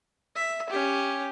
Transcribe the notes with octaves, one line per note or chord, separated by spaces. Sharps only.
E5
C#4 G4